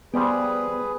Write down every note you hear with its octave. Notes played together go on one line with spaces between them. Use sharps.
F3 G3 B3 G#4 B4 G5